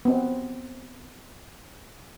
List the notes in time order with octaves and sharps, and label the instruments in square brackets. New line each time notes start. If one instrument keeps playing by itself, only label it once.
[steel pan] B3 C4